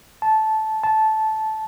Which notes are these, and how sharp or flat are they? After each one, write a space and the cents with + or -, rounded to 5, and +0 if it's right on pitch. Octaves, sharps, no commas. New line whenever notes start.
A5 -15
A5 -15